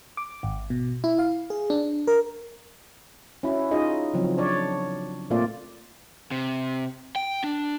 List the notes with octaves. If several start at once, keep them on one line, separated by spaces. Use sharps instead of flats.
D6
G#1
B2
E4
F5
G#4
D4
A#4
C#4 E4 F#4
D#4 F4 G#4 D#5
C#3 F3 F#3 C4
D4 C#5 D5
A#2 A3 A#3 C4 F4 D5
C3
G5
D4